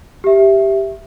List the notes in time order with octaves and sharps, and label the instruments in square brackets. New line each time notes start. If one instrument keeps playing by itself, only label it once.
[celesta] G4 E5